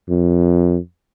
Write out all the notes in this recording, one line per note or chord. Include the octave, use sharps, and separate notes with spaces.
F2